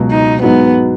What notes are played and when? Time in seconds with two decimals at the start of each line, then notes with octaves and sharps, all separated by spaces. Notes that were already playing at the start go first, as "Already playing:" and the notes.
Already playing: C#2 B2 F#3
0.12 D#4
0.42 G#2 F#3 B3 D#4